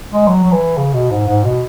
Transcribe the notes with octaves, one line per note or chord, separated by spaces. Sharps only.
G#3
F#3
F#3
E3
C#3
B2
G#2
G#2
B2